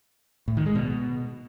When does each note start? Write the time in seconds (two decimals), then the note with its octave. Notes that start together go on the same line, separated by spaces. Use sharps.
0.48 A2
0.57 D#3
0.66 G#3
0.75 B2